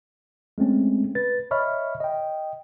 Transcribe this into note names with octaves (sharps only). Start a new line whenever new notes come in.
G#3 A3 C4 C#4
B4 A6
C#5 D#5 E5 B5 C#6 F6
D#5 G5